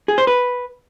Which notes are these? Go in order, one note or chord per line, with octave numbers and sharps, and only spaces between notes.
G#4
C5
B4